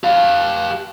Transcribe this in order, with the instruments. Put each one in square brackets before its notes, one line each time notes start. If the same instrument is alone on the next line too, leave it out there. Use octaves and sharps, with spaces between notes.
[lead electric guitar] G4 F5